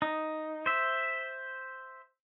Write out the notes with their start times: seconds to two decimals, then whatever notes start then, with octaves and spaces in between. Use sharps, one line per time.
0.02 D#4
0.66 C5 E5